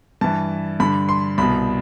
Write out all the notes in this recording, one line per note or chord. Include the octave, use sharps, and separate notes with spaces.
G2 E3 A5
G2 D3 B5
C6
C2 B2 B5